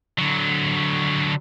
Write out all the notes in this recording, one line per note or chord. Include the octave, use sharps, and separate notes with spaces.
D3 F#3